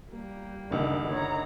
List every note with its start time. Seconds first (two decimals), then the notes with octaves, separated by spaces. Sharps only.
0.11 G3 A#3
0.70 F#1 D2 D#3
1.10 C#5 A#5